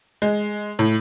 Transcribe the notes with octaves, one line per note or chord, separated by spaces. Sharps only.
G#3
A2